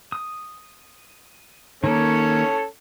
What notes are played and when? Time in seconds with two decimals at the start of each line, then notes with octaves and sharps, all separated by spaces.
0.12 D#6
1.84 D#3 A#3 C#4 A4 C#5